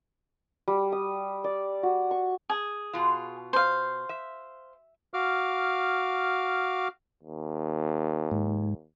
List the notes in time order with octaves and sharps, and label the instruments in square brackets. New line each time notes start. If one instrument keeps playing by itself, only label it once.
[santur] G3
D#6
D5
F#4
C#6
[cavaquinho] G#4
[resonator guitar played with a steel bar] B2 F4
[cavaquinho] C5 F5
[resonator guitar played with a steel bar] E5
[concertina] F#4 F5 D6 F6
[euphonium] D#2
[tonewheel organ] G#2